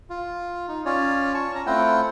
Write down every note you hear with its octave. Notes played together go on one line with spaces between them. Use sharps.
F4
D#4
C#4 F4 C#5 D5
A5 C#6
C#4 A#5
A3 C4 E4 F4 F#5 G5